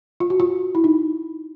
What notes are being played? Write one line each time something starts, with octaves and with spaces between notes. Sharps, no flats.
F4
F#4
F4
E4
D#4